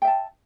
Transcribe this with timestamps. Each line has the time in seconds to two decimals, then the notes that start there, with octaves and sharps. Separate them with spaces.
0.02 G5
0.05 E5
0.07 A5